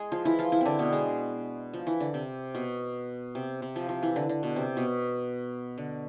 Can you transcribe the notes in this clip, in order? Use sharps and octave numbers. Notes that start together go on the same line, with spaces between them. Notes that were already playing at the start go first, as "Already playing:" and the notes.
Already playing: G#3 G#4
F3 F4
E3 E4
F3 F4
E3 E4
D3 C4 D4
B2 B3
G#3
F3
E3
D3
C3
B2
C3
C3
F3
F3
E3
D3
D3
B2
C3
B2
D3